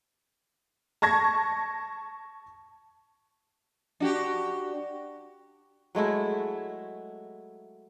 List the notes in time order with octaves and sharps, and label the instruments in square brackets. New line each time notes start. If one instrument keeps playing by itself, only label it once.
[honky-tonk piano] A5 C#6 G#6 A#6
[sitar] D4 F#4 G4
[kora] F#3 G#3 A3 E4